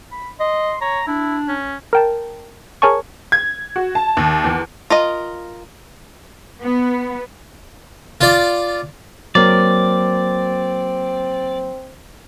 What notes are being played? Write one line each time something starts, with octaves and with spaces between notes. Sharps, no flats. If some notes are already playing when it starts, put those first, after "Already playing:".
B5
D#5 C6
C#5 A#5
D4 E4
C#4
A#4 G5 A5
G#4 A#4 C#5 G#5 A5 C#6
G#6
F#4
A5
D#2
E2
F4 A#4 D#5
B3
F4 D5
F#3 A#3 C4 D5